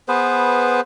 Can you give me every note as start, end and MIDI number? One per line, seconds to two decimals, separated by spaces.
0.08 0.81 59
0.08 0.81 68
0.08 0.81 71
0.08 0.81 72